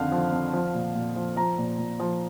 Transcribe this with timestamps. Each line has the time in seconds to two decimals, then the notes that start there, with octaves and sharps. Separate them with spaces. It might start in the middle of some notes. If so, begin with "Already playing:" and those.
Already playing: F2 D3 D#3 F5
0.12 F3
0.32 F2
0.53 F3
0.74 A#2
0.95 A#2
1.16 F3
1.36 F3 A#5
1.58 A#2
1.78 A#2
1.99 F3